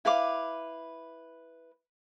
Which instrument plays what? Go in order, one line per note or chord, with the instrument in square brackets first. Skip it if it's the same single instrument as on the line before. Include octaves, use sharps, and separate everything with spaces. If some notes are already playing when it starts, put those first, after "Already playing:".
[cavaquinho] E4 B4 F5 D6